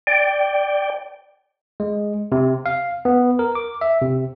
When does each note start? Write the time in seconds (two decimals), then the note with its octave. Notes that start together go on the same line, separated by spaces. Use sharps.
0.07 D5 G5
1.80 G#3
2.32 C3
2.66 F5
3.05 B3
3.39 A#4
3.55 D6
3.81 E5
4.02 C3